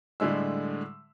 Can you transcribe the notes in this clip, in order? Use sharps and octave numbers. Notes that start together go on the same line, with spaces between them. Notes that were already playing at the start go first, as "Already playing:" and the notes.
A2 D3 G3 G#3 E6